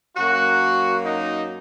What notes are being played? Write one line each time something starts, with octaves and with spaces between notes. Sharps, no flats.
F#2 F#3 A#3 F#4
D#4